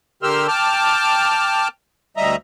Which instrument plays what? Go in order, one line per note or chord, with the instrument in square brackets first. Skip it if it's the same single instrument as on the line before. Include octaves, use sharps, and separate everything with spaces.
[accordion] D3 G4 A#4 C6 E6 F6
G5 A5 D6 F6
D2 G3 D#5 E5 A#5